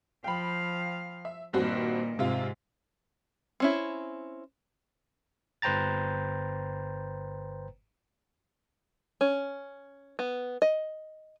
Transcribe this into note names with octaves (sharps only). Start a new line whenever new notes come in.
F3 F5 G5 B5
E5
G2 A#2 D#3 C4 F#4
G#2 C3 F4
C4 C#4 E4
G1 B4 C5 G5 A#5 A6
C#4
B3
D#5